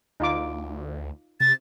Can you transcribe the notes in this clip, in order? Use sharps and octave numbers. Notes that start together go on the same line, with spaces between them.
D2 D#4 F4 D6
C3 A6